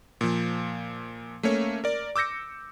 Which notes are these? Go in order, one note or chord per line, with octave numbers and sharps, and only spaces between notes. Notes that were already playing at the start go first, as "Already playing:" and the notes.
A#2 F3
A3 A#3 C#4 C#5
A#4 D5
D6 E6 G6 A#6 C#7